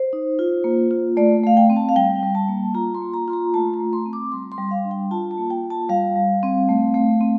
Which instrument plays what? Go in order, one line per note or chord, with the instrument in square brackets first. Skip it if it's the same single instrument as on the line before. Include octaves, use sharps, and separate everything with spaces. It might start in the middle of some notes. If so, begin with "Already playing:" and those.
Already playing: [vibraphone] C5
D#4
F4
A#3
F4
A3 D5
A3 F5
G5
C4
A5
F5
G3 G5
G3
A5
A#3
F4 A#5
C6
A#3
A#5
F4 C6
A#5
A3 A5
A#5
A3
C6
C4
D6
G3 C6
C6
G3
F5
D4
G5
F4 A5
A5
A#3
G5
F4
A5
G3 F5
G3
C4
A3
A3
C4